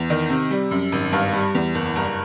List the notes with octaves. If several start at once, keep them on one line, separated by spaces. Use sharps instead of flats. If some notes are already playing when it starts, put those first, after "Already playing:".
Already playing: E2
D#3
C3
G3
F#2
G#1
G2 F5
G3
E2
F#1
G2 A#5